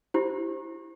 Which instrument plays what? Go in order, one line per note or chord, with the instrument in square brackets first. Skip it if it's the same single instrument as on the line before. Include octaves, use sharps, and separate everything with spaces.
[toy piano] E4 G4 C5